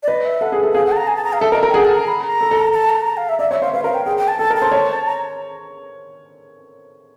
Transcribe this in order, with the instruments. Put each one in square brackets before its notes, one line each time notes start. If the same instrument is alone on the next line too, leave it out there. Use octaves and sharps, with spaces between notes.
[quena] D5
[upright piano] B4 [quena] D#5
[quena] E5
[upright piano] A4 [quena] F#5
[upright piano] G#4
A4
[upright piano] G#4 [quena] F5
[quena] F#5
A5
A#5
G#5
A5
A#5
F5
[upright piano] A4 [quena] E5
[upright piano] A#4 [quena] D#5
[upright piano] A#4
[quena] G5
[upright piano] G#4 [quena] F#5
[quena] A5
A#5
B5
A#5
[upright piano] A4
A4
[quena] A5
A#5
A#5
F5
E5
[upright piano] D5 [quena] E5
[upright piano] C#5 [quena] E5
[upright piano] C5 [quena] F5
[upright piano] B4 [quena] F5
[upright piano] A#4 [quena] F5
[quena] G5
[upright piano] G#4 [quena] G5
[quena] G5
A5
[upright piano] A4 [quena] A5
[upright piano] A#4
[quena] A5
[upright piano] C5
C#5
[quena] A#5